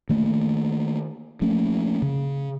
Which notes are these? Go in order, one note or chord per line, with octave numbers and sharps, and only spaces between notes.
D#3 A3 A#3
F3 A3 A#3 C#4
C#3